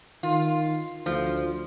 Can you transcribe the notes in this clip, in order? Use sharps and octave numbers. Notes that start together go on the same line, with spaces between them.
D#3 F4
D2 F3